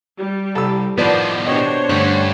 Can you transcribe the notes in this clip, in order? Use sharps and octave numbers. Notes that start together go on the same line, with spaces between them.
G3
C2 A4 B5 E6
A2 D#3 F3 B3 C5 D5 A5
B2 D4 G4 C5 C#5 D#5
G2 D3 G3 A3 C#4 F#6